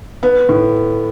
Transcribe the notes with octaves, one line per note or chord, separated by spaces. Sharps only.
B3
A2